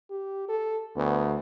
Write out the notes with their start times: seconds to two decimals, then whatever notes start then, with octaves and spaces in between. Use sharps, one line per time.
0.10 G4
0.49 A4
0.96 D2 B3